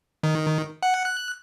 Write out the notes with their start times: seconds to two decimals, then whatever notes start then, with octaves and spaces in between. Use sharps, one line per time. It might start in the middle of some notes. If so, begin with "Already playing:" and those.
0.23 D#3
0.83 F#5
1.05 F#6